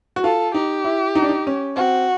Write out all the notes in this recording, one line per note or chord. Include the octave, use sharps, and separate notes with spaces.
F#4
F4 A4
D#4 G4
E4
D#4
D4
D#4
C#4
C4 F#4